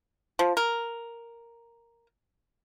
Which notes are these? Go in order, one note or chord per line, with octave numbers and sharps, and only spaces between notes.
F3
A#4